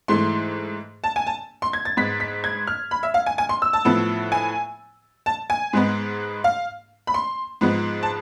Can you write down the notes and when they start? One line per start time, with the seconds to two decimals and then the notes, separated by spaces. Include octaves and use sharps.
0.08 G#2 E3 A3 C6
1.04 A5
1.16 G#5
1.27 A5
1.62 C6
1.73 G#6
1.85 A6
1.97 G#2 G#3 B3 B6
2.20 B6
2.44 G#6
2.67 F6
2.91 B5
3.03 E5
3.14 F5
3.26 G#5
3.38 G#5
3.49 C6
3.62 E6
3.73 A5
3.85 A2 F3 B3
4.32 G#5
5.26 A5
5.50 G#5
5.73 G#2 G#3 B3
6.44 F5
7.07 B5
7.14 C6
7.61 G#2 F3 G#3 B3
8.03 A5